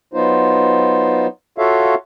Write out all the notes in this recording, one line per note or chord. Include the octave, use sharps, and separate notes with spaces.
F#3 B3 D#4 F4 C5
F4 F#4 A4 C#5 E5 F5